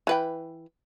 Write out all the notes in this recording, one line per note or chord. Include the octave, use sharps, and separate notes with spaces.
E3 B4 G5